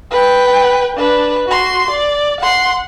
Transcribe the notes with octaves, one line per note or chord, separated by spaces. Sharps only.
B4 G5
D4 B4
F#4 C6
D5
F#5 C6